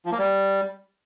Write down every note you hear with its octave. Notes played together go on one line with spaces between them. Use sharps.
F3
A#3
G3